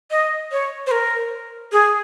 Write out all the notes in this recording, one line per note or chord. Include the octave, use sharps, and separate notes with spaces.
D#5
C#5
C5
A#4
G#4